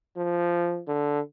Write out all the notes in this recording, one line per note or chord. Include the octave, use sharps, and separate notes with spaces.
F3
D3